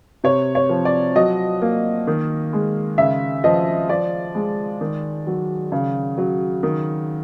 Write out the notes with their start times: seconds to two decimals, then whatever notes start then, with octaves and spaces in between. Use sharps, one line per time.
0.24 C3 C#5
0.55 C#5
0.69 F3
0.85 D5
1.16 F#3 D#5
1.62 A#3
2.07 D#3
2.53 G#3
2.98 C#3 E5
3.44 F3 D#5
3.89 F3 D5
4.35 G#3
4.81 D#3
5.27 F#3
5.72 C#3
6.18 F#3
6.63 D#3